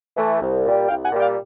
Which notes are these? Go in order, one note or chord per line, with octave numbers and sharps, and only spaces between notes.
E3 A3
C2
A#2 G3
C2 F5 G5
F#5 G#5
A#2 G3
F5 G5